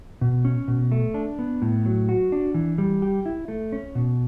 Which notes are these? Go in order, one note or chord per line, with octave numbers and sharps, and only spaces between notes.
B2
C#4
B2
A3
D4
B3
A2
F#3
F#4
D4
E3
G3
G4
E4
A3
C#4
B2